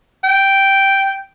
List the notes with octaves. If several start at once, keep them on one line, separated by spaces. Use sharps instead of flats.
G5